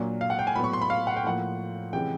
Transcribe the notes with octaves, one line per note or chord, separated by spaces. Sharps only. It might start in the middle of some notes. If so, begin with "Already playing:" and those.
Already playing: A#2 F#3 A#3 D4
F5
F#5
G5
G#5
A2 F#3 B3 B5
C#6
C6
B5
F5
F#5
G5
A2 F3 A#3 F#5
C3 E3 G#3 C#4 G5